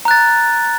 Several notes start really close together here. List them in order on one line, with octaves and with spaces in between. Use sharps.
A#5 F#6 A6